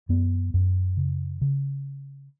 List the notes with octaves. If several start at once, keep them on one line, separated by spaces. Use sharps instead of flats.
F#2 B3
F#2
C#3
C#3